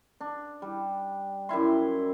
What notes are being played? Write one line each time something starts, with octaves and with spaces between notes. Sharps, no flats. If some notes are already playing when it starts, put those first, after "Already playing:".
D4
G3
F#2 G3 E4 C6